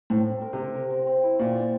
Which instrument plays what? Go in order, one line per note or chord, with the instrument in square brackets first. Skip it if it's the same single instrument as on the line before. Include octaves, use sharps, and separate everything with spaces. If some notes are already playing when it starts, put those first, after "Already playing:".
[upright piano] A2 [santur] C4
[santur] C4
A#4
[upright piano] C3
[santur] A#4
A#4
C4
C4
E4
[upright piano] A#2 [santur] G4
[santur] D5